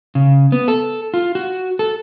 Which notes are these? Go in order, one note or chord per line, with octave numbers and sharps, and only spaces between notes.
C#3
B3
A4
F4
F#4
A4